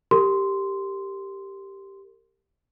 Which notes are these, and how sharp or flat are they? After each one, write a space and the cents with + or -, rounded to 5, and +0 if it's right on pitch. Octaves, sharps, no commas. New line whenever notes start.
G4 +0 A#4 -35 C6 -10